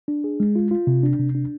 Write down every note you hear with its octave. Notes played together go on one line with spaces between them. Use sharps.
D4
G#4
G#3
F4
F4
C3
D4
C3
D4